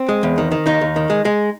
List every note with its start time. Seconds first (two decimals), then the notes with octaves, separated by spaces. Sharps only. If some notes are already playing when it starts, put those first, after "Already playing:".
Already playing: C4
0.09 G#3
0.23 E2
0.38 D#3
0.52 D#3
0.66 D#2 D#4
0.81 D#2
0.96 D#3
1.10 G#3
1.25 G#3